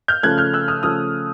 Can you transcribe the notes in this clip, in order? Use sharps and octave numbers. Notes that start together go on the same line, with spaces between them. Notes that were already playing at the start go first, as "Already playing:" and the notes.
F6 G6
C#3 F3 A3 F#6 G#6
F6 G6
E6 F#6
D#6 F6
C#3 F3 A3 D#6 F6